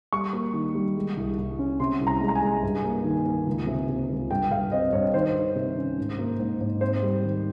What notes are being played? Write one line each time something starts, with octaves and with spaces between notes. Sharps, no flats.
G3 C#6
A#3
D#3
G3
G#3
C2
C2
C#4
C3 C6
C2
A#5
G#3
A#5
G#5
G#3
G2
A#3
D#3
A#3
C#2
C3
C3
C#2
G2 G5
G2 F5
C4 D#5
G2 C#5
D#3 C5
D#3
C3
C#4
G#2
A#3
G#2
G#2
C4 C5
G3
D#3